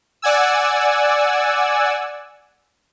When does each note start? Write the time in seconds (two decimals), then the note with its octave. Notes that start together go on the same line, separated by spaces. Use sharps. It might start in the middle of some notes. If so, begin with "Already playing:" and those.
0.22 D5 F#5 G#5 E6